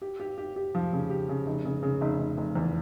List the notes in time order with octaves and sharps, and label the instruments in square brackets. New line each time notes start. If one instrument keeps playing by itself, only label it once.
[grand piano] G4
G4
G4
G4
F3
C#3
G4
C#3
F1
C#3
C#3
F1
F1
F1
E2